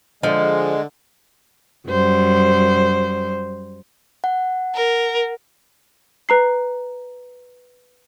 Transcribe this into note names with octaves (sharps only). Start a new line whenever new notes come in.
D3 F3 G#3 D5 D#5
F#2 G3 C5
F#5
A#4
B4 A#5 C7